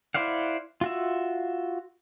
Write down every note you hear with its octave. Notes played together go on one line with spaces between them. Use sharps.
E4 C5 D5 F5 F#5
F4 F#4 E5